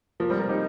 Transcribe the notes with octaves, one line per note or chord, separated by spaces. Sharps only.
F3 A#3
G3 C4
A#4
D#4 G4